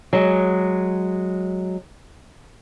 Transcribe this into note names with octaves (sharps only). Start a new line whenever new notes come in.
F#3 G#3